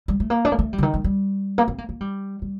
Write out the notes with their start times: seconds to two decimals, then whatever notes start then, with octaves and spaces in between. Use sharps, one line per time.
0.08 G3
0.20 A3
0.30 A#3
0.45 D4
0.52 A#3
0.59 A3
0.73 G3
0.78 D3
0.83 D#3
0.94 G3
1.04 G3
1.58 A#3
1.68 C4
1.78 A#3
1.89 A#3
2.01 G3
2.42 G3